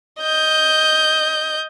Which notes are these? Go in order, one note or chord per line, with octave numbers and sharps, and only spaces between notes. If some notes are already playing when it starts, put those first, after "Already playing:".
D#5 G6